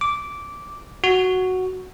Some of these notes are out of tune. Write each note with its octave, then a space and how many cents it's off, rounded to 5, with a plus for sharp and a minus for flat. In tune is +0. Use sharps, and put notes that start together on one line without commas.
D6 -10
F#4 +0